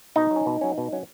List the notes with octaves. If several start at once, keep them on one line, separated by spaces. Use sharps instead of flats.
B2 D#4
F#3
C#4
B2
F#3 C#4
B2
F#3 C#4